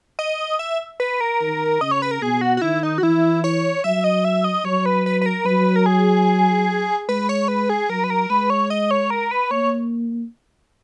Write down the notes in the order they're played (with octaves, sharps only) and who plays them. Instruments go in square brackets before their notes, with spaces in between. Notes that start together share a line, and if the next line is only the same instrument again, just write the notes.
[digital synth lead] D#5
E5
B4
A#4
[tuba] D#3
[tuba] C#3 [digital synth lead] D#5
[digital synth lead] C#5
B4
A#4
[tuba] B2 [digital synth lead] G#4
[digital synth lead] F#4
F#4
[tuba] D#3 [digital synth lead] E4
[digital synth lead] D#4
F#4
[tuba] E3 [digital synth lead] E4
[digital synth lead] C#5
[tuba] F#3 [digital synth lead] E5
[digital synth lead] D#5
E5
D#5
[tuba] F#3 [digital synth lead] C#5
[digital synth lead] B4
B4
B4
A#4
[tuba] F#3 [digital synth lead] B4
[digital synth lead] A#4
G#4
[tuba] G#3 [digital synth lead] B4
[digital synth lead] C#5
B4
G#4
[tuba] F#3 [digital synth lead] A#4
[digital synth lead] B4
A#4
[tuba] G#3 [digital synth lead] B4
[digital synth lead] C#5
D#5
C#5
A#4
B4
[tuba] A#3 [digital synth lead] C#5